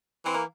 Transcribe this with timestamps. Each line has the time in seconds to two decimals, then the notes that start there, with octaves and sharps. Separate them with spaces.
0.25 E3 C4
0.34 A#3